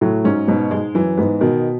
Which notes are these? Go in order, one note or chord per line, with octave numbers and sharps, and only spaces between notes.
A2 F#3
G#2 C#4
G#2 B2
G#2 G#3
F#2 E3
G#2 B3
B2 D#3